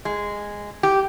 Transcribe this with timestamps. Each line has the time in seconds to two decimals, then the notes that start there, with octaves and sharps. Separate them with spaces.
0.05 G#3
0.83 G4